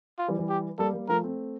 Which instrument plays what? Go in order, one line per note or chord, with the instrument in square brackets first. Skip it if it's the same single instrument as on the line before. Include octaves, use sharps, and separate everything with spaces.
[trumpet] F4
[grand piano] E3 G3
E3 G3
[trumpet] G4
[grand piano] G3 A#3 [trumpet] A4
[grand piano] G3 A#3
[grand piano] F3 A3 [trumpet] A#4
[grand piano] A3 C4